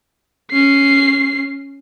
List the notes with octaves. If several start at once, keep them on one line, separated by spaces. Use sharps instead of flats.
C#4 C7